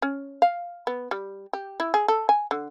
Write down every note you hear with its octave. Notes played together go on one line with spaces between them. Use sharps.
C#4
F5
B3
G3
G4
E4
G#4
A4
G#5
D3